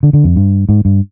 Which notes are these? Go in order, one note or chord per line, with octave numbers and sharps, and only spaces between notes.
D3
D3
F2
G2
G#2
G2